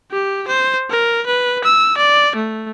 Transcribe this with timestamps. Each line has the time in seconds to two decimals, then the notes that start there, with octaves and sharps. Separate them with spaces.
0.11 G4
0.47 C5
0.90 A#4
1.26 B4
1.64 E6
1.97 D5
2.36 A3